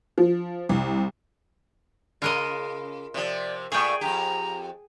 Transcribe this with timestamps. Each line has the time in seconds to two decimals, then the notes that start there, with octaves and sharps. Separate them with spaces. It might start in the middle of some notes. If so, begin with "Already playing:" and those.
0.18 F3
0.69 C2
2.22 C#3 F4 A#4 D#5
3.14 C3 F3 D5
3.72 A#2 A3 G#4 G5 C#6
4.01 F2 G#2 G4 A#5